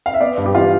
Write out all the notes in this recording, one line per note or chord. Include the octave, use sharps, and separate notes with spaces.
F5
E5
B3 D5
G2
G4
E3 F4